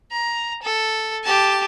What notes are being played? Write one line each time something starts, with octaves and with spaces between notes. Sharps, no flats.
A#5
A4
G4 A5